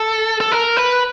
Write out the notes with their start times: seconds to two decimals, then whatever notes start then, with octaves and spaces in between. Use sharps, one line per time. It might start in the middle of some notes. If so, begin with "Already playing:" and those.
Already playing: A4
0.40 A4
0.52 A#4
0.77 B4